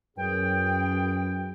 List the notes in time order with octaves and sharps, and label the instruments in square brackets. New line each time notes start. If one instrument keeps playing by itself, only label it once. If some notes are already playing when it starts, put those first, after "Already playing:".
[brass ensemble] F#2 [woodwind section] E3 G#4 G5